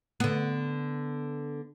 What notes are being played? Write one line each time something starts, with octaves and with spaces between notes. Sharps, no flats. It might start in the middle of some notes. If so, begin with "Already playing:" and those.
D3 B3